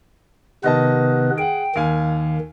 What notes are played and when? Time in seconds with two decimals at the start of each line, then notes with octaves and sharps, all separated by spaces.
0.64 C3 D#3 B3 B4 D#5 A5
1.38 G#4 F#5 G5
1.76 D#2 D#3 F5 G#5